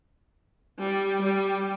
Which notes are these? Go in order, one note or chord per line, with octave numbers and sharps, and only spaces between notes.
G3
G3